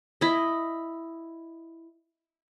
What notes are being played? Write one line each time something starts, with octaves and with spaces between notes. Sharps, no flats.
E4 D#5